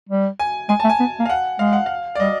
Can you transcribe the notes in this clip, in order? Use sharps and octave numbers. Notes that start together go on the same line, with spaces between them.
G3
G#5
G#3 G#5
A3 A5
G#5
B3
A#3
F5
F#5
G#3 F5
F#5
F5
D5
G3 D#5